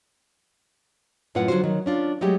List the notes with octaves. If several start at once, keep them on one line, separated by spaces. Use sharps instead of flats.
F#2 A2 F4 B4 F#5
D3 F#3 G3 F4 F#4 C5
D#3 F#3
C#4 D4 F4
F#3 G#3 A3 G4